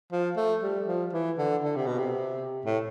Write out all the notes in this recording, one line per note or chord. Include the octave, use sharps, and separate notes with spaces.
F3
A3
G3
F3
E3
D3
D3
C3
B2
C3
A2